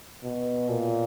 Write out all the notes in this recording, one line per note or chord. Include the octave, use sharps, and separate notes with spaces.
B2
A#2